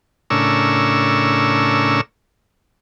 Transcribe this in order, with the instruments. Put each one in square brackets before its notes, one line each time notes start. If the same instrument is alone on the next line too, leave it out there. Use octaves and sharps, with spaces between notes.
[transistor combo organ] A2 C#3 D4 A#4 C#6 E6